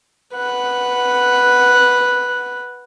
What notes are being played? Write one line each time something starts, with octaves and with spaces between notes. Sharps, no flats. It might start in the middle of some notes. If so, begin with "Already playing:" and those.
B4 F#5